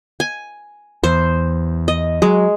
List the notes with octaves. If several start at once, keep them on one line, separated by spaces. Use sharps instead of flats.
G#5
E2 C5
D#5
F#3 G#3